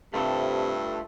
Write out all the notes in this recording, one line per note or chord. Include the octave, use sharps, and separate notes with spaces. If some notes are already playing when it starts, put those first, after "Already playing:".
G2 C3 A3 F4 A4